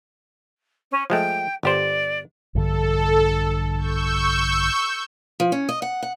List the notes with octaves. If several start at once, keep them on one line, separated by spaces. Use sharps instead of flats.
C#4
F3 G#3 A3 G5
G1 G4 C5 D5
A#1 G2 D3 A4
C#6 E6 G6
F3
C#4
D#5
F#5
F#5